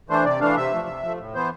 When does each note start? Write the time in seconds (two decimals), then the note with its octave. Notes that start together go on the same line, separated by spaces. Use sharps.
0.09 E3 A3 D4 C5
0.25 C3 D5
0.41 E3 A3 D4 F5
0.57 C3 E5
0.73 F3 A3
0.87 C3
1.03 F3 A3
1.19 A2
1.34 E3 B3 C5